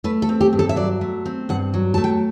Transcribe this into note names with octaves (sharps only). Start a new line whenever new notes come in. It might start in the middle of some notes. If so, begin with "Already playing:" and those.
A3 B4
A4
C4
G4
G2
A4
E5
F#3 D5
A3
C4
G2 F#5
F#3
A3 A5
G5